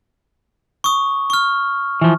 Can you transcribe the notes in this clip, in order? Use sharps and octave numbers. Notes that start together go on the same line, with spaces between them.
C#6 D#6
C#6 F6
E3 F3